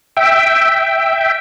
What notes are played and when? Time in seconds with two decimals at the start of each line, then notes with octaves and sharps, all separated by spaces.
0.17 E5 G5